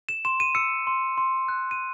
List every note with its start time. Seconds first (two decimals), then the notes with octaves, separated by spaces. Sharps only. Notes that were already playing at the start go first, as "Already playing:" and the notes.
0.09 E7
0.25 C6 E7
0.40 D#7
0.55 E6 C#7
0.87 C6
1.18 C6
1.48 F#6
1.71 D#7